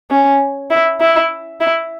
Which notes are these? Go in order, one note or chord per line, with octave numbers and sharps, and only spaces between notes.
C#4
E4
E4
E4